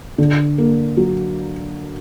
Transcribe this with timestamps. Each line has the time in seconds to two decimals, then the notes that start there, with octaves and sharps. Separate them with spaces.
0.18 D3
0.58 A#3
0.97 F#3